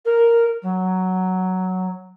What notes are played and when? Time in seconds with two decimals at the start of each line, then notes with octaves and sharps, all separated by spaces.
0.05 A#4
0.62 F#3